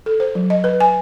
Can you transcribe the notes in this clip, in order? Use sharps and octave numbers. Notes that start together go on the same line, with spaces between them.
A4
C5
F#3
D#5
B4
G#5